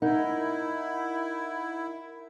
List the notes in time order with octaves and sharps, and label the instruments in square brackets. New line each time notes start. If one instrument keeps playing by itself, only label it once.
[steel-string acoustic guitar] D#4 [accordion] E4 [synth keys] A#4 F#5 G6